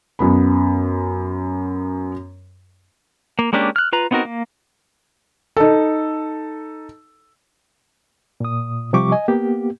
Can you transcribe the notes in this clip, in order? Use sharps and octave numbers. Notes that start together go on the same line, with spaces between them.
F#2 B3 B5
A#3
G#3 A#3 C#4 D4 G4
F6 F#6
F4 B4 A#5
B3 C4 D#4 F#4 A#4
A#3
D#4 A4
A#2 D#6
C3 F3 G3 G4 C#6 D6
D#5 G#5
A#3 B3 G4